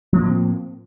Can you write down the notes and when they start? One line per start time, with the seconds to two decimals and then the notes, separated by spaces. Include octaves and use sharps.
0.13 F3
0.17 A#3
0.21 A2
0.25 C4